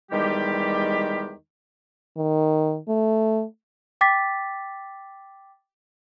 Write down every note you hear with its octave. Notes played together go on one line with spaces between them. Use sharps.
E2 D#3 G3 G#3 G4
D#3
A3
G5 D6 A6 B6